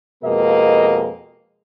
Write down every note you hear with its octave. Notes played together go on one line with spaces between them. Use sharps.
F2 B2 G#3 A#3 B4 D#5